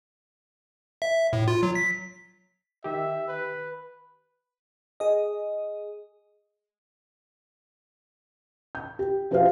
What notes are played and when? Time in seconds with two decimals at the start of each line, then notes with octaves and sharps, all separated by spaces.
1.02 E5
1.33 A2
1.48 F4
1.63 F#3
1.75 B6
2.84 D#3 G4 E5
3.28 B4
5.00 G#4 D#5
8.75 G6
8.99 G4
9.31 F3 F#4 G4 C5 E5 F5